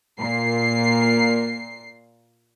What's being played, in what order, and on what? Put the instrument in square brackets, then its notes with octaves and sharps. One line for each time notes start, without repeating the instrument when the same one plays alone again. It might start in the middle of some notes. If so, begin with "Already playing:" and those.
[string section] A#2 C7 [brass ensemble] A#3